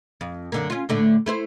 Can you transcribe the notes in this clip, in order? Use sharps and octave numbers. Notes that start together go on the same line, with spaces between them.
F2
F#2 D3 A#3
C#4 F4
A2 D3 A3
A3 E4 C5